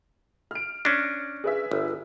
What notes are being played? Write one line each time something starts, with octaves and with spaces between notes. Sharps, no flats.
F6 D7
C#4 D4 A#6
G#4 B4 E5
G1